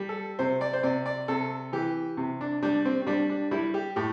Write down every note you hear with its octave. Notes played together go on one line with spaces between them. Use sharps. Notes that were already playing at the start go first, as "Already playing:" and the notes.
Already playing: G3
A4
C3 C5
D5
C5
C3 D5
D5
C3 A4
E3 G4
C3
D4
G3 D4
C4
C4
G3 D4
D4
G3 E4
G4
A2 G4